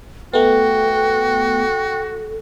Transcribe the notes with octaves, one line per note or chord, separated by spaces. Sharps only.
A3 B3 F#4 A4 G5